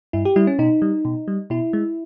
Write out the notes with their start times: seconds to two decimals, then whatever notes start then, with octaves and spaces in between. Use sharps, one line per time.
0.13 G2 E4
0.25 G4
0.36 G3 E4
0.47 C#4
0.59 B2 D#4
0.82 G3
1.05 B2
1.28 G3
1.50 B2 E4
1.73 G#3